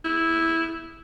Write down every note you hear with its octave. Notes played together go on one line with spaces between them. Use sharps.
E4